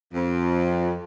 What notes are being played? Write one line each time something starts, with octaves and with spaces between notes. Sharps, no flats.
F2